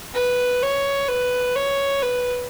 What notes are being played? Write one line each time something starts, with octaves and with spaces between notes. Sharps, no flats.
B4
C#5
B4
C#5
B4